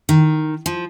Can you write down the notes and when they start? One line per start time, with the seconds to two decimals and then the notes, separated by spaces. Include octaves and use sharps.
0.09 D#3
0.66 F3